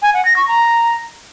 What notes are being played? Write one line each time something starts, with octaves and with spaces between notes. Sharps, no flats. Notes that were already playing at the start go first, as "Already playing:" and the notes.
G#5
F#5
A#6
C#6
A#5